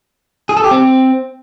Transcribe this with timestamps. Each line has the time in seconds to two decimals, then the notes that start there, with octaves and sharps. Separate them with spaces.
0.49 G#4
0.57 A4
0.64 G4
0.71 C4